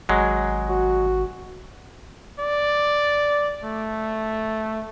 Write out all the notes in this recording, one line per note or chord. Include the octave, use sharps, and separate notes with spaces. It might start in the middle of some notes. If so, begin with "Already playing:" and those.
G#1 F#3 G#3
F#4
D5
A3